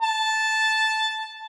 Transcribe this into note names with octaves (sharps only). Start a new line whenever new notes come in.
A5